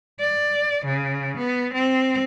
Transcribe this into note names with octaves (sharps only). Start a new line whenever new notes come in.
D5
C#3
B3
C4